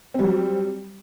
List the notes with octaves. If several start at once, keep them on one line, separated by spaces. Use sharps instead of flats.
F#3 G3 C4